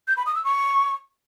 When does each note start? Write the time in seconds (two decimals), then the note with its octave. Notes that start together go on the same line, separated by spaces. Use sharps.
0.08 G6
0.17 B5
0.26 D#6
0.35 E6
0.45 C#6